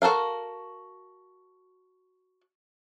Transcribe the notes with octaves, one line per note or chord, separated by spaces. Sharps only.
F#4 A4 A#4 F5